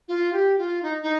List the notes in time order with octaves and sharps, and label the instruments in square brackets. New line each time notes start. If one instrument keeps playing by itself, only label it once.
[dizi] F4
G4
F4
D#4
D#4